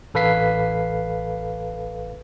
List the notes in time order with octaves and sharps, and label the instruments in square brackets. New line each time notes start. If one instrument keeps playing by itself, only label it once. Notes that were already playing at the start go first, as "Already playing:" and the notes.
[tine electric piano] A1 A4 B4 F5 B6 C7